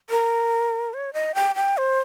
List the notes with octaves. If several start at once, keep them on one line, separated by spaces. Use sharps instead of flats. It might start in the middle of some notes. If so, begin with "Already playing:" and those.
A#4
C#5
D#5
G5
G5
C5